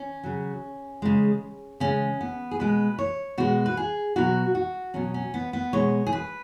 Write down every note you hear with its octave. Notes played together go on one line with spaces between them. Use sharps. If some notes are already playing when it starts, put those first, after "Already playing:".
Already playing: C#4
C#3 F#3
C#3 G#3
C#3 G#3 C#4
B3
G#4
B2 G#3 B4
C#5
B2 G#3 F#4
B4
G#4
B2 F#3 F#4
F#4
B2 F#3 C#4
C#4
B3
B3
B2 G#3 C#5
G#4
B4